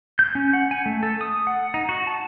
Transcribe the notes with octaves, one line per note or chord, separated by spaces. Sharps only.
G6
C#4
F#5
G#5
A3
A4
D#6
F#5
D#4
F#4
A5